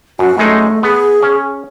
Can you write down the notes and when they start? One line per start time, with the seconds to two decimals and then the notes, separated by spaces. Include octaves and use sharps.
0.19 F#2 F#4
0.38 F#2 G#3 A3 D#4
0.83 B3 G#4
1.23 C#4